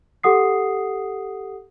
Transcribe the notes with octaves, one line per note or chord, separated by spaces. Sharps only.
G4 A4 F#5 D#6 C7